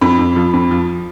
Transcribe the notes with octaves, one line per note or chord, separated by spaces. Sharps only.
F2 B5
F2
F3
F2
F3